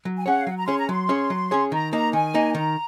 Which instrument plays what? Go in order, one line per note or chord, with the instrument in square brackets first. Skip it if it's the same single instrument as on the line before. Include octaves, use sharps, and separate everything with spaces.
[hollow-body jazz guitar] F#3
[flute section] G#5
[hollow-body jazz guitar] C#4 G#4 C#5 [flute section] F#5
[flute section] F5
[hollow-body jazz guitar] F#3 [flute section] F#5
[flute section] A#5
[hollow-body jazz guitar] C#4 G#4 C#5 [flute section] C6
[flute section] A#5
[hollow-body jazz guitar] F#3 [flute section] C6
[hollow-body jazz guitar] C#4 G#4 C#5
F#3
C#4 G#4 C#5
[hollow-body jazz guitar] D#3 [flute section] A#5
[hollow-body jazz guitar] A#3 D#4 [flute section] A#5
[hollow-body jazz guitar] D#3 [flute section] G#5
[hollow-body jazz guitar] A#3 D#4
[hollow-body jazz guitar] D#3 [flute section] A#5